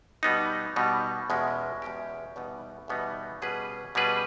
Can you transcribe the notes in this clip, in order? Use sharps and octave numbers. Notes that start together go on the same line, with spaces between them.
B2 G3 B3 D#4
B2 G3 B3 D#4
E2 B2 G#3 C#4 G4
E2 B2 G#3 C#4 G4
E2 B2 G3 B3 D#4
E2 B2 G3 B3 D#4
B2 G3 C#4 G#4 B4
B2 G3 C#4 G#4 B4